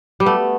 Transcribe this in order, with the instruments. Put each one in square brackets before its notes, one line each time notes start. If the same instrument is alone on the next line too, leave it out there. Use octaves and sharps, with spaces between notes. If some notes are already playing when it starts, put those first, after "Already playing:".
[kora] G3
[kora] A3 [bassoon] B3